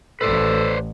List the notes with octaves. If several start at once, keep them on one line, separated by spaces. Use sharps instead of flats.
A1 A4 B4 C5 D5